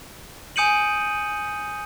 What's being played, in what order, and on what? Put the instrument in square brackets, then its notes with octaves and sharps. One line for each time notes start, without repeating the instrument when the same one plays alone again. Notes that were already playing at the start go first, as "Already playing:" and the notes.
[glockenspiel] G#5 D#6 G6 C#7 D#7 F#7